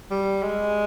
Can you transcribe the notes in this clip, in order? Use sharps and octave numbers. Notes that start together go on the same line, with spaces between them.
G3
G#3